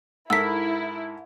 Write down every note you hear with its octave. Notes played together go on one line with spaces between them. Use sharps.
G#2 E4 A4 A#4 E6 B6